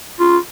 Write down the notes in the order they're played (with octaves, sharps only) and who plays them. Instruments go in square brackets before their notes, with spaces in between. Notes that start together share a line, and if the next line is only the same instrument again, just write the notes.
[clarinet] F4